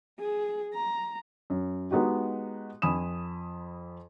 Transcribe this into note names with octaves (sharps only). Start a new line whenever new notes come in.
G#4
A#5
F#2
G#3 B3 D#4 F#4 G4
F2 G#5 B5 D#6 E7